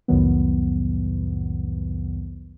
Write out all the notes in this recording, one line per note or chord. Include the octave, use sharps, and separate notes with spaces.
C2 F2 A2 D#3 F#3 B3